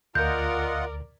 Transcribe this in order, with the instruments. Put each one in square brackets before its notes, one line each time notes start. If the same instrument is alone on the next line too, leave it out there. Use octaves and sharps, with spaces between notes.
[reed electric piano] D2 [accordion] F4 D#5 F#5 [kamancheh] A#4 D5 [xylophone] G6